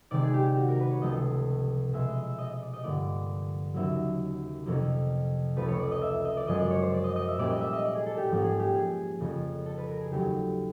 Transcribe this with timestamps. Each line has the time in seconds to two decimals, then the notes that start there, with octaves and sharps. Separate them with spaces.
0.11 C3 D#3 G#3 D5
0.23 G#4
0.34 G4
0.46 G4
0.57 F#4
0.68 A#4
0.80 B4
0.91 C#5
1.02 C#2 C3 F3 A3 C#4 D#5
1.93 B2 G#3 C#4 E5
2.08 D#5
2.24 E5
2.39 D#5
2.51 D#5
2.62 D5
2.73 D#5
2.83 G2 D3 F3 A#3 D5
3.74 D#2 C#3 F#3 A#3 C#4 E5
4.66 F2 C3 F3 A#3 C#4
5.56 C#2 C#3 F3 A3 B4
5.68 C#5
5.80 D5
5.92 D#5
6.02 E5
6.13 E5
6.25 D#5
6.37 D5
6.47 F#2 C#3 F3 G#3 C#4 D#5
6.58 D5
6.71 C#5
6.82 C5
6.94 D5
7.04 D#5
7.16 D#5
7.28 E5
7.38 A#2 G3 A#3 C#4 D5
7.50 D#5
7.61 E5
7.73 D#5
7.85 D5
7.95 G#4
8.06 A4
8.18 G4
8.29 G#2 F3 A#3 C#4 G4
8.44 G#4
8.60 G4
8.75 G#4
9.20 F2 C#3 F3
9.66 A4
9.78 B4
9.88 A#4
10.00 G#4
10.11 D#2 C#3 F#3 A3 C#4 G4